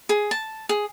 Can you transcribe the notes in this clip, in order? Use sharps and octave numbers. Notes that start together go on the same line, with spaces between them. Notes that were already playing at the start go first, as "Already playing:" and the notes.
G#4
A5
G#4